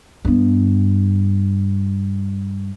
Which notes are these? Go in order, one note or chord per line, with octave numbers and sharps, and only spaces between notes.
G2 B3